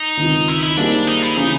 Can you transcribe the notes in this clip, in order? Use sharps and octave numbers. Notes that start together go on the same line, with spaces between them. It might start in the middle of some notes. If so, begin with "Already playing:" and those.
Already playing: D#4
C#2 C3 D#3
E4
E4
G3 A#3 D4 D#4 G#4 C5
D#4
E4
C#3 E3 A3 D#4